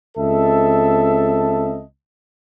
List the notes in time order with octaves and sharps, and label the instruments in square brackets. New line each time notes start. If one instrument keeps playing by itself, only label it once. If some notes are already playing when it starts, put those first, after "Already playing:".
[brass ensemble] C#2 C4 A4 D#5 E5 A5